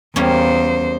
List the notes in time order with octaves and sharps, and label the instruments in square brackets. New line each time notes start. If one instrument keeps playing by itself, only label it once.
[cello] E2 C5 [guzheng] G3 A#3 C#4